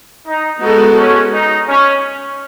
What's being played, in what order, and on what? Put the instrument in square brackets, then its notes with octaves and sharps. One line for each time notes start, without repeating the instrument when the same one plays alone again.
[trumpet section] D#4
[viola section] G#3 B3 F#4 A4 [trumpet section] D#4
[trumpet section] C#4
D#4
C#4